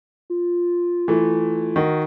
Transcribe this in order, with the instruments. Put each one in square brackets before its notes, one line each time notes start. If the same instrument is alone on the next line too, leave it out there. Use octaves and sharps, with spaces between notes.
[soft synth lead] F4
[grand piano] E3 A3
D#3 F#4